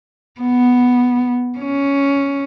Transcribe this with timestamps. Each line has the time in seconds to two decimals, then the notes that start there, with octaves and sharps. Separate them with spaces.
0.40 B3
1.59 C#4